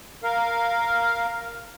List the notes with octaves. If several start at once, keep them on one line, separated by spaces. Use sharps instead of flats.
A#4 F5